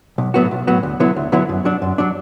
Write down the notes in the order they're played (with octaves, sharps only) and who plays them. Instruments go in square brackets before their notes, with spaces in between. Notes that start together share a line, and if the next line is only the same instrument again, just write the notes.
[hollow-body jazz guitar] B1
A2 F#3 B3 F#4
B1
A2 F#3 B3 F#4
D2
D3 F#3 B3 E4
D2
D3 F#3 B3 E4
F#2
F#3 D4
F#2
F#3 D4